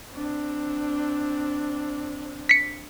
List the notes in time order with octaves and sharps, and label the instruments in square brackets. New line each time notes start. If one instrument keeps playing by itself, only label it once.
[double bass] C4 D4
[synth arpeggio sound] B6 C#7